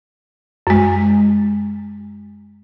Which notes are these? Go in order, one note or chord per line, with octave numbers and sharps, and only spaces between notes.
F#2 G#3